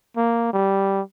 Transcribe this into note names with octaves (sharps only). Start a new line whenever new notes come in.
A#3
G3